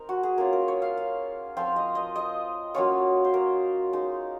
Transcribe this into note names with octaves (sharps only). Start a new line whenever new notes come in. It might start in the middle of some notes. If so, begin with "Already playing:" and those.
Already playing: C4 D#4 A#4
F#4
G#4
A#3 C#4 F4 A#4
A#4
C#5
F5
F5
F3 C4 F4 F5
D#5
D#5
D#5
F#3 A#3 C#4 F4 C#5
C5
A#4
G#3 D#4